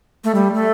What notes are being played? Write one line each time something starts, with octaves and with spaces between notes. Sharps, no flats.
A3
G3
A3